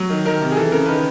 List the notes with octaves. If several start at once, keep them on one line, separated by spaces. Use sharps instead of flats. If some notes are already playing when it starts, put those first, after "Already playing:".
Already playing: F#3
D#3
D#3 A#4
C3
G#4
E3 A4
C#3 A#4
D#3 B4